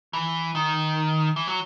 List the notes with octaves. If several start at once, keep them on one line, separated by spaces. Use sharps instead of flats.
E3
D#3
E3
F#3